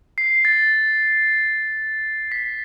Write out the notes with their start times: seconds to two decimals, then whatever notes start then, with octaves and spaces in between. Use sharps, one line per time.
0.18 C7
0.45 A6
2.32 B6